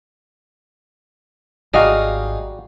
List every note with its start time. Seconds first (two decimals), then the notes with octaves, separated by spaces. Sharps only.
1.74 G#1 G3 D#4 F4 F#4 G#4 D#5 F5